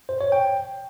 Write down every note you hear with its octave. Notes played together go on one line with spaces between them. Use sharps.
C5
C#5
G5